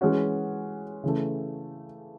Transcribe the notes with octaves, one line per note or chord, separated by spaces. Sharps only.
E3 G#3 C#4 F#4
C#3 E3 A3